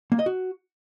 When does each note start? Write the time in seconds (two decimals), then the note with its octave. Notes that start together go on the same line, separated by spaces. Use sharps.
0.12 A#3
0.19 D#5
0.26 F#4